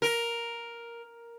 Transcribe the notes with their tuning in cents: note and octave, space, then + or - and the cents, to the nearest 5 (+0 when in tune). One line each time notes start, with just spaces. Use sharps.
A#4 +5